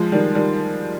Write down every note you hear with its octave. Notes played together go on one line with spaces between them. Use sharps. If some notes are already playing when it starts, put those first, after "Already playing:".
Already playing: F3 G#3
D#3 G3
D#3 G3